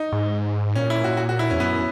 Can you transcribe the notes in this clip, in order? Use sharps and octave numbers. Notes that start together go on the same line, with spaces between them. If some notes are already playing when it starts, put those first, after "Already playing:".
Already playing: D#4
G#2
A#2 C#4
E4
F#4
F#4
F#4
E4
E2 C#4
F#2 B3